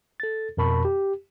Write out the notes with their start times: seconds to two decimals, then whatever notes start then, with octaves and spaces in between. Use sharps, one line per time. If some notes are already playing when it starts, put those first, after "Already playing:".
0.20 A4 A6
0.57 F2 B2 A#4 A5 B5 C#6
0.85 G4